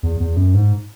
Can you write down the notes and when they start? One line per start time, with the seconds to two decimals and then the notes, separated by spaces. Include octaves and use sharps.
0.03 E2
0.20 E2
0.36 F#2
0.54 G#2